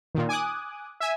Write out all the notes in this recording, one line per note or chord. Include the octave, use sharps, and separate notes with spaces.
A#2 D#3
G#5 D6 D#6 F#6
E5 G#5